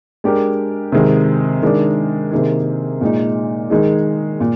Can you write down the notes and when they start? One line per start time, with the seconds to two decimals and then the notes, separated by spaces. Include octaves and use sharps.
0.24 G#3 D4 G4 A#4
0.92 C3 D#3 G#3
1.63 D#3 G#3 D4
2.31 C3 D#3 A#3 D#4 G#4
3.01 A#2 G#3 D#4
3.70 D#3 G#3 D#4 G#4
4.40 A#2